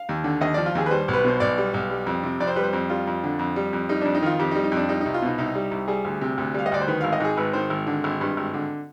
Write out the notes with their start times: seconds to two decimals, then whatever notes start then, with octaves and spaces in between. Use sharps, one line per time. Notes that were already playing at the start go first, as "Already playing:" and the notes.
Already playing: F5
0.09 D#2
0.24 D3
0.41 D#2 D#5
0.54 F3 D5
0.66 F4
0.75 D#2 G#4
0.86 B4
0.91 G3 C5
1.08 B1
1.13 B4
1.24 B2 C5
1.40 B1 D5
1.58 G3
1.74 B1
1.90 G3
2.07 F2
2.23 C3
2.40 F2 D5
2.47 C5
2.56 G3 B4
2.63 C5
2.73 F2
2.90 G3 F4
3.07 F2
3.24 D3
3.39 F2
3.56 G3
3.73 F2
3.89 G3 D#4
4.01 F2 D4
4.15 D#4
4.23 D#3 F4
4.39 F2 G4
4.51 D#4
4.55 G3
4.64 D#4
4.72 F2
4.77 D4
4.89 G3 D#4
5.01 C2 D#4
5.14 F4
5.22 B2 D#4
5.38 C2 D#4
5.55 G3
5.71 C2
5.88 G3 G#4
6.05 D2
6.21 C3
6.38 D2
6.54 G3 F5
6.66 D#5
6.72 D2 D5
6.81 C5
6.87 D#3 B4
7.01 G#1 F5
7.13 D#5
7.20 G#2 G#4
7.37 G#1 B4
7.53 D#3 C5
7.70 G#1
7.87 D3
8.04 G#1
8.21 G2
8.37 G#1
8.54 D3